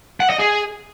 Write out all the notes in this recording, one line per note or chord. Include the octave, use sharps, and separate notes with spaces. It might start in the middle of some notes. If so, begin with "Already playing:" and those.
F#5
D#5
G#4